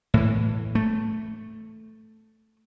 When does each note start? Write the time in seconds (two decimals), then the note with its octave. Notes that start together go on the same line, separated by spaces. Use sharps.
0.14 A2 E3
0.75 A3